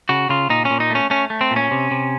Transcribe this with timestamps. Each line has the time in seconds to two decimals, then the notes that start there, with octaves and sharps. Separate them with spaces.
0.09 C#3 F#4
0.29 C#3 F4
0.50 A#2 D#4
0.65 C#4
0.70 A#2
0.80 D#4
0.90 A3 C#4
1.10 A3 C#4
1.30 A3
1.41 C4
1.51 A#2
1.56 C#4
1.71 C3
1.91 C3